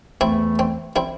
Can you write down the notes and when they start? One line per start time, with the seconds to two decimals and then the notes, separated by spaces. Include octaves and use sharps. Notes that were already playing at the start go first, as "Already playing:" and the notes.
0.21 E2 E3 A3 C4 E4
0.59 C4
0.96 C4 E4